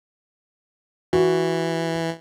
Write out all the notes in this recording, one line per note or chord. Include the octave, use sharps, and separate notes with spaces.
E3 F#4